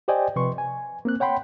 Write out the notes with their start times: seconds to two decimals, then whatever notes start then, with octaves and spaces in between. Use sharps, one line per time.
0.08 G4 C5 D5 D#5 G5 G#5
0.36 C3 F3 B4 C6 C#6
0.58 G#5
1.05 A#3 C4 F#6
1.20 C#5 F#5 G5 B5 C6